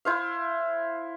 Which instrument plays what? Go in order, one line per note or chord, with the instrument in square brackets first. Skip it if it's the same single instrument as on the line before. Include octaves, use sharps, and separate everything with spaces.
[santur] E4 C5 F5